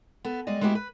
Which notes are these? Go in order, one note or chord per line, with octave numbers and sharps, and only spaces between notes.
B3 A4
G3 G#3 D5 D#5
G#3 A3 B3 E4 F#4 G4
B4